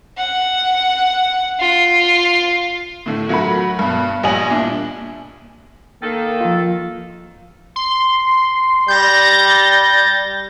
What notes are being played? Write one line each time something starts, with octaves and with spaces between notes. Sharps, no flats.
F#5
F4
A2 D3 A3
F#3 A3 F#4 A#4 B5
G2 B2
A#1 G3 D#5 G#5 F#7
A#2 D4 E4
D#3 A#3 A4
F3 F4
C6
G3 G6 A6 A#6